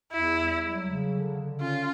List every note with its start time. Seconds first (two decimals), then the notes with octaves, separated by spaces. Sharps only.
0.12 E2 E4
0.37 G3
0.62 F#3
0.86 C#3
1.11 D3
1.36 D3
1.60 C#4 F4